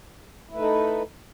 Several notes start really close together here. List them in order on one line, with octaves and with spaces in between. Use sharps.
E4 A3 B4 D#4 A4